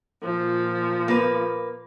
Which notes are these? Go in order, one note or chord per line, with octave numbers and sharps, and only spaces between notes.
A#2 F3
A#3 B4